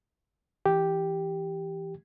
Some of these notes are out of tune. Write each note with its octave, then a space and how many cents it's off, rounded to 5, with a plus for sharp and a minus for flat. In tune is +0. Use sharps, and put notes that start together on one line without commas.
E3 +0 G4 +0